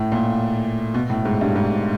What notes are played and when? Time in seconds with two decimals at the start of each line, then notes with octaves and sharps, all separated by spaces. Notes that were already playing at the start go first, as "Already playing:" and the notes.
Already playing: A2
0.12 A#2
0.94 B2
1.10 A2
1.25 G#2
1.41 G2
1.56 G#2